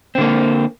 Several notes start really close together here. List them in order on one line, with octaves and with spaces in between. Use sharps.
C4 D3 A#3